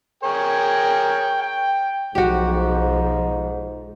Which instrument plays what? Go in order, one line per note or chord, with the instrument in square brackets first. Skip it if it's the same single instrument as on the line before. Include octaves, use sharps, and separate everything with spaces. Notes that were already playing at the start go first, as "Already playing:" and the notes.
[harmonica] G#4 A#4 C#5 [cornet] G5
[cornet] G5
[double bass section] B1 F3 [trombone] G#2 [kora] F#4 G4